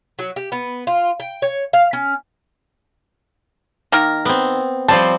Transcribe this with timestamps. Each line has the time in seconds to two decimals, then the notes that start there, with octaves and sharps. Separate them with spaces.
0.19 F#3
0.36 G4
0.52 B3
0.87 F4
1.20 G5
1.42 C#5
1.73 F5
1.93 C#4
3.92 D#3 A#3 A#4
4.25 B3 C4
4.88 F3 G3 C4 A5